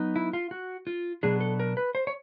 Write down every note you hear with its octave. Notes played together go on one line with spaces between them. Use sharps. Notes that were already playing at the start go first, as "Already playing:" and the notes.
Already playing: F#3 B3 D#4
E4
F4
F#4
F4
B2 F#3 B3 D4 G#4
A4
A#4
B4
C5
C#5